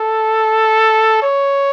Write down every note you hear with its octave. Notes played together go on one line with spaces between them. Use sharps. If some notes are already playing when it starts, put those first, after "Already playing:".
Already playing: A4
C#5